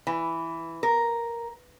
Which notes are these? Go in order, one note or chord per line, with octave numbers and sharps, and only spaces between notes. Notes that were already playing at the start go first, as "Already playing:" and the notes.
E3
A#4